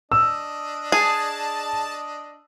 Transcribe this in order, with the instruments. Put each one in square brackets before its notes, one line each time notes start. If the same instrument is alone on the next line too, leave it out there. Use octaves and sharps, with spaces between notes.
[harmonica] D4 D#5 [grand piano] E6
[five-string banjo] G#4 [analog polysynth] A5